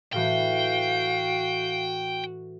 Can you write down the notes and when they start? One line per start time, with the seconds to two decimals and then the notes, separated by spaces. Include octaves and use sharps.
0.13 A2 E3 F#4 F5 G5